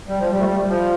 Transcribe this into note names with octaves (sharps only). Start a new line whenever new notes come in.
G3
F3
G3
A3
G3
F3